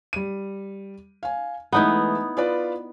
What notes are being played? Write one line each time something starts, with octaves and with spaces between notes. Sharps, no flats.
G3 D#7
F5 G#5
E3 G#3 A3 B3 D#4 E4
F4 B4 D5